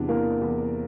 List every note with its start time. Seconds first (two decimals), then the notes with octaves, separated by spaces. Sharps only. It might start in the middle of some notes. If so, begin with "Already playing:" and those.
Already playing: E2 C3 D4
0.08 E3 A#3 A#4
0.42 E2